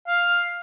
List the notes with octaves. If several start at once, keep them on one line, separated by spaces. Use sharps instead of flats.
F5